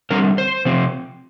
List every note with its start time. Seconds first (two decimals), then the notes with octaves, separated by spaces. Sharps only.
0.10 D3 G3 C4 A#4
0.38 C5
0.65 C3 F3 C4